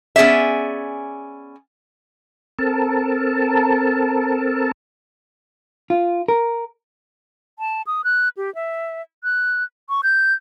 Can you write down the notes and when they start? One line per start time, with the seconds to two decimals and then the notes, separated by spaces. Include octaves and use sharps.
0.16 B3 C#4 G#4 D5 E5
2.59 C4 A4 A#4 A5
5.90 F4
6.28 A#4
7.59 A5
7.87 D#6
8.04 F#6
8.37 G4
8.55 E5
9.24 F#6
9.89 C#6
10.03 G6